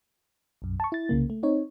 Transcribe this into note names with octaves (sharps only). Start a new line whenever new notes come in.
B1 F#2
A5 C#6
E4 A6
C2 C#3 A#3
A3
C4 D#4 C#5